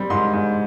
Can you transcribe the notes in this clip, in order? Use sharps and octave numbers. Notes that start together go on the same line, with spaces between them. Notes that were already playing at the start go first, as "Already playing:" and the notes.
Already playing: G3 C4
G#2 C6
G#2